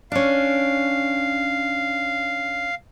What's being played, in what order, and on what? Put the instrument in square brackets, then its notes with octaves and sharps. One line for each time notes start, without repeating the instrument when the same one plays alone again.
[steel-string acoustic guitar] C#4 D4 [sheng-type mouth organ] F5